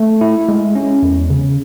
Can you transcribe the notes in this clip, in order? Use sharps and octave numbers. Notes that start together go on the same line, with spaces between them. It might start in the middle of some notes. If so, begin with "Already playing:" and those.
Already playing: A3
E4
G#3
C#4
E2
C#3